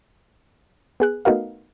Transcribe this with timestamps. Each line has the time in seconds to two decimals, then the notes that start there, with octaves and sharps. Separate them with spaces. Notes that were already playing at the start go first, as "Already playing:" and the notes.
1.00 B3 G#4 F#6
1.25 A3 B3 D#4 F#4 A#4 F5